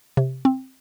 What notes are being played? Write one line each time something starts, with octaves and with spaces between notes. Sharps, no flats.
C3
C4